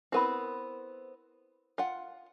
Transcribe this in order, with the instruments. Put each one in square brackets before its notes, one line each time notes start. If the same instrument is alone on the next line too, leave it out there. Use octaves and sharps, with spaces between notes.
[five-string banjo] B3 C4 [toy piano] E4 A#4 B5
[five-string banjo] F4 F#5